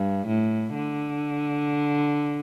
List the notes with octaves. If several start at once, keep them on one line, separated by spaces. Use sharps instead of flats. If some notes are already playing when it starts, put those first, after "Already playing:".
Already playing: G2
A2
D3